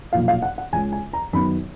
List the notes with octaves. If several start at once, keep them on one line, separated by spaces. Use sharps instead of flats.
B1 A#2 F3 F5
F5
F#5
F#5
C#2 C#3 G#3 G#5
G#5
A#5
F#2 D#3 F#3 B3 D#4 B5